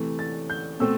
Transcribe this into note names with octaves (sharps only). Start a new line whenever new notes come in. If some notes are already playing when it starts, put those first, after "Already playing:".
Already playing: C3 E3 A3
A6
G6
B2 A3 C4 E6